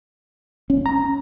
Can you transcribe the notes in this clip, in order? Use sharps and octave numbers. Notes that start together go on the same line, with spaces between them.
C#4
A#5